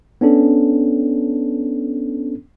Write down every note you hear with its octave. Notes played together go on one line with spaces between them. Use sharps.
B3 C#4 D4 A4